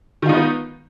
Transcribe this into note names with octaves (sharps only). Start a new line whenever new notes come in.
D#3 B3 D#4 F4